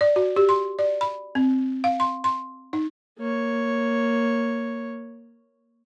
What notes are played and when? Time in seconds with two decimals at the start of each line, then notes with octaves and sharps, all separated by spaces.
0.01 D5
0.16 F#4
0.36 G4
0.49 C6
0.79 D5
1.01 B5
1.35 C4
1.84 F5
2.00 C6
2.24 C6
2.73 D#4
3.19 A#3 C#5